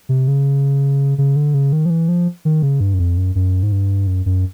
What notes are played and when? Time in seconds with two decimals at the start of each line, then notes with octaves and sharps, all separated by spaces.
0.09 C3
0.28 C#3
1.18 C#3
1.36 D3
1.54 C#3
1.73 D#3
1.86 F3
1.90 E3
2.08 F3
2.45 D#3
2.62 C#3
2.80 G2
2.94 F#2
2.99 F2
3.17 F#2
3.35 F#2
3.63 G#2
3.72 G2
4.07 F#2
4.26 F#2